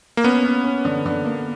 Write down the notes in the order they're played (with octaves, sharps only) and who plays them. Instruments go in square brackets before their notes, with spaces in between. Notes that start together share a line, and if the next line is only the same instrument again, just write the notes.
[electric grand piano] A#3
[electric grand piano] B3 [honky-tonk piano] C#4
[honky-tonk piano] C#4
C#4
D3
D3
A#3